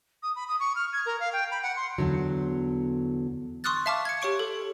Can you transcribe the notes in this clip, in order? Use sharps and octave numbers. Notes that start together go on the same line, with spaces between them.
D#6
B5
D#6
C#6
F6
G#6
A#4
F5
G5
B5
F#5
C6
E2 D3 F#3
C6 C#6 D#6 F6 F#6 A6
E5 F5 A5 C#6 D6 F6
G#6 C#7
G4 C#5 C#6 D7
A4